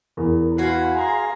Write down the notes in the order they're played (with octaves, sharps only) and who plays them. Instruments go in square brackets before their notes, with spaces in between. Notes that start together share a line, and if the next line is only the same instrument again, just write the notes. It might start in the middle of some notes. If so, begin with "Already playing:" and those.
[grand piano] E2 [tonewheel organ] A#4
[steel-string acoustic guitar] C#4 F#4 [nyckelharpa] B4 F#5 [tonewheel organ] F5 G#5 C6
[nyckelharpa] G#4 A#5